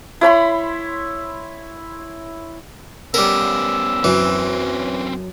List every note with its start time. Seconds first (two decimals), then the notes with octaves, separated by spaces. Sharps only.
0.21 E4 C#5 B5 C6
3.14 G3 B3 C#4 A#4 E6
4.04 F#2 E3 C4 C#4